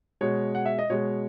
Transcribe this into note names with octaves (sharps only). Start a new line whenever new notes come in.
B2 G#3 C#5
F#5
E5
D#5
B2 G#3 C#5